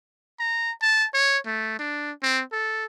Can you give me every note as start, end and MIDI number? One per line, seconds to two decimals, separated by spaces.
0.39 0.72 82
0.82 1.06 81
1.14 1.38 73
1.46 1.78 57
1.79 2.12 62
2.23 2.43 60
2.53 2.85 69